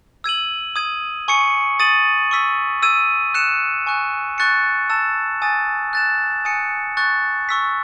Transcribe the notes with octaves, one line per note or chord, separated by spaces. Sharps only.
E6 G#6 D#7 F#7
D#6 G#6 D#7
G#5 C#6 G#6 C#7
D#6 A6 D#7 F#7
C#6 E6 B6
E6 G#6 D#7
F#6 C#7 E7
G#5 C#6 F#6
C#6 F#6 A6 C#7
A5 E6 A6 E7
G#5 D#6 A6
F#6 A6 E7
G#5 D#6 F#6 C#7
C#6 F#6 A6
C#6 E6 B6